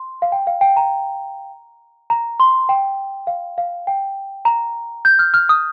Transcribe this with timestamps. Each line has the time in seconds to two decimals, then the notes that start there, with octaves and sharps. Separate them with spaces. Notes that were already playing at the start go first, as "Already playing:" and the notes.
Already playing: C6
0.22 F5
0.32 G5
0.47 F5
0.61 G5
0.77 A#5
2.10 A#5
2.40 C6
2.69 G5
3.27 F5
3.58 F5
3.87 G5
4.45 A#5
5.05 G6
5.19 F6
5.34 F6
5.49 D#6